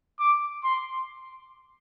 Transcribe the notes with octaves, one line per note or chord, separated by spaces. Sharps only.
D6
C6